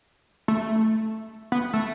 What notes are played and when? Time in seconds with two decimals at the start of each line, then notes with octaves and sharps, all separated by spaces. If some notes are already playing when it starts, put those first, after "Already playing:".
0.48 A3
1.52 B3
1.73 A3